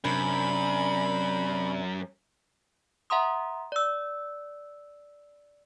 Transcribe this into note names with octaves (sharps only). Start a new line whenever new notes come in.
F#2 C3 D4 B5
E5 F#5 A#5 C6 D#6
D5 E6